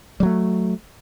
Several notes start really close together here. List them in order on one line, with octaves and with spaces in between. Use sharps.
G3 F#3 A3